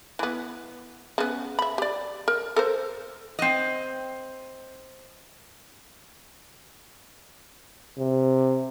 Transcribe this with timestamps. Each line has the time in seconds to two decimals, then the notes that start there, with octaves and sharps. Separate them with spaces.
0.19 E3 B3
1.18 C#3 B3
1.59 E5 B5
1.78 G4 D5
2.28 A#4
2.56 A4 A#4 C5
3.39 C4 D#5
7.98 C3